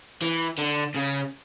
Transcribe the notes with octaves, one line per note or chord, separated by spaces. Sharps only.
E3
D3
C#3